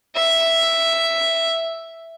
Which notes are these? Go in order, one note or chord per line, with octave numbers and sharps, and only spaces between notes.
E5